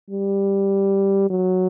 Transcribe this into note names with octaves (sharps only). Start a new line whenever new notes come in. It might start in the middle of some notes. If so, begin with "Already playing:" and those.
G3
F#3